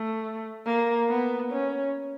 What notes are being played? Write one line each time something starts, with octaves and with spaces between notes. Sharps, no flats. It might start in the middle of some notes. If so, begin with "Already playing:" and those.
Already playing: A3
A#3
B3
C#4